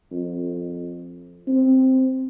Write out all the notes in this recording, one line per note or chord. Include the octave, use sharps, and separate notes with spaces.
F2
C4